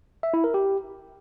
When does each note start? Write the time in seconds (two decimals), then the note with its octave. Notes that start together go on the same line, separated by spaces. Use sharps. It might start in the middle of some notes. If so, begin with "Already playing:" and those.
0.23 E5
0.34 E4
0.44 A#4
0.54 G4